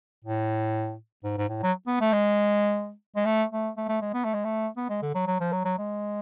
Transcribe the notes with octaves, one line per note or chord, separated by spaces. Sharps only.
A2
G#2
G#2
A2
F#3
B3
A3
G#3
G#3
A3
A3
A3
A3
G#3
B3
A3
G#3
A3
B3
G#3
D3
F#3
F#3
F3
F#3
F#3
G#3